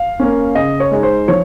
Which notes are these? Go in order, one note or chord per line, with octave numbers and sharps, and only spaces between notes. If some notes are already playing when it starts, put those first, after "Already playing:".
Already playing: F5
A#3 C#4
C#3 D#5
C#5
G#3 D#4
C5
F3 C#5